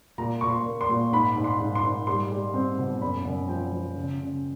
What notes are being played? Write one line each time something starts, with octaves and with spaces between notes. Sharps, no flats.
A#2 A#5
A#2 C#6
C6
A#3
C6
A#2
G#2 B5
G#2
C6
G#2
C6
G#2
G3 C6
G3
C4
B2
F#2 B5
F#2
F3 G5
F3
C#3
C#3